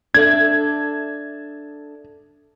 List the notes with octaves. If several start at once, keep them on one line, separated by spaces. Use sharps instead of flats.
D4 A4 E5 G#6